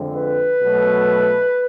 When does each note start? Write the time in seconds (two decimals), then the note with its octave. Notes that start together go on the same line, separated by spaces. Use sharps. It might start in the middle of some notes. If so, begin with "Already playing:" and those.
Already playing: F2 D3 F3 G#3 C4
0.15 B4
0.61 B2 F#3 A3